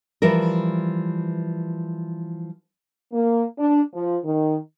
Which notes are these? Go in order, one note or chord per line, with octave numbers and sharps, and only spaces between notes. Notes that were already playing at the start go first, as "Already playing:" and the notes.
E3 F3 G3 A#4
A#3
D4
F3
D#3